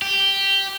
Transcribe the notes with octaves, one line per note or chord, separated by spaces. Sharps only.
G4